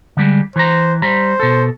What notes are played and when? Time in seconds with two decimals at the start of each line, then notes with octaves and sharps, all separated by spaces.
0.17 D3 G3 G#3
0.56 E3 C5 A#5
1.02 G3 C5 A#5 B5
1.40 B2 A4